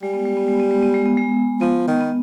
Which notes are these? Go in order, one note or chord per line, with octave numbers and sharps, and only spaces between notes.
G3 G#3
B3
G#3
B3
G#3
B3
G#3
B3
G#3
B3
G#3
F3 B3
D#3
B3